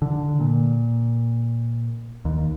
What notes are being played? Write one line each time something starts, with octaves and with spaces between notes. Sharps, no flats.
D3
A#2
D#2